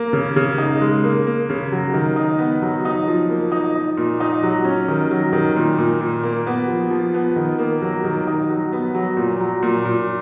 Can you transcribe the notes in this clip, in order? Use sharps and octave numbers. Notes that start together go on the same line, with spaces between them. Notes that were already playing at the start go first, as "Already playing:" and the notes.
Already playing: A#3
C#3
C#3
D#4
G#3
A#3
A#3
C#3
F#3
D#3
D#4
B3
F#3
D#4
F3
A#3
D#4
D#4
A#2
D#4
F#3
C#4
D#3
F#3
D#3
A#2
A#2
A#2
A#3
B3
F3
F3
B3
D#3
A#3
F#3
D#3
D#4
F#3
B3
F#3
A#2
F#3
A#2
A#2